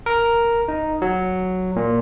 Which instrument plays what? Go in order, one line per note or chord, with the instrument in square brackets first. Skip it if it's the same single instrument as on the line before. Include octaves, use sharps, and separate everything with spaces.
[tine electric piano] A#4
D#4
F#3
A#2